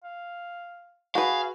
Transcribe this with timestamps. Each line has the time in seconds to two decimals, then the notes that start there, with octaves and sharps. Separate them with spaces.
0.04 F5
1.15 F#4 G#4 B4 F5